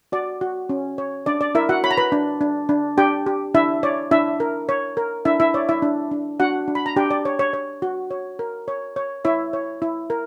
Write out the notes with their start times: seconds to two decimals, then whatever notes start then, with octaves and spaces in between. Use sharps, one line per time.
0.12 F#4 D5
0.41 F#4
0.69 C#4
0.98 C#5
1.26 D4 D5
1.41 D5
1.55 E4 A#4 E5
1.69 F#4 F#5
1.83 C#5 B5
1.91 A#5
1.98 B4 B5
2.12 D4
2.41 D4
2.69 D4
2.98 D4 G4 G5
3.26 G4
3.55 D4 E4 E5
3.83 C#5 D5
4.11 D4 E4 E5
4.40 A#4
4.69 C#5
4.97 A#4
5.25 D4 E4 E5
5.40 E4 E5
5.54 C#5 D5
5.69 E4 E5
5.82 D4
6.11 D4
6.40 D4 F#4 F#5
6.68 D4
6.75 B5
6.86 A#5
6.96 D4 G4 G5
7.11 D5
7.25 C#5
7.39 C#5
7.53 C#5
7.82 F#4
8.11 C#5
8.39 A#4
8.68 C#5
8.96 C#5
9.25 E4 C#5 E5
9.53 C#5
9.82 E4
10.10 A#4